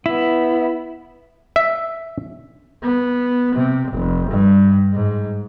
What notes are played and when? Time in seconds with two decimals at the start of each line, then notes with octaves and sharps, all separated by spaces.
0.06 B3 E4
1.56 E5
2.83 B3
3.55 C3
3.92 F1
4.30 G2
4.93 G#2